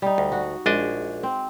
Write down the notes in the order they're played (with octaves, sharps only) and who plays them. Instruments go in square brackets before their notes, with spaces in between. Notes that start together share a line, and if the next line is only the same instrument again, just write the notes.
[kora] G3 D#4
[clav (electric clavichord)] D2
[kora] F#4
[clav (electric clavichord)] A#1 D4 D#5 [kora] G#3
[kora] C4